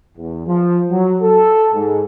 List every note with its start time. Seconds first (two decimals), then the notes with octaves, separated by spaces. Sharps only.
0.17 E2
0.47 F3
0.90 F#3
1.22 A4
1.74 G#2